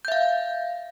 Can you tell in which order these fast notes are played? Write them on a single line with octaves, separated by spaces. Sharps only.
G6 E5 F5